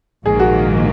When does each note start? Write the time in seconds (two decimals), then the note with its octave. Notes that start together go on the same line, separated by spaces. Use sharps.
0.25 A#1 G#2 D#3 A#3 G#4
0.40 F#4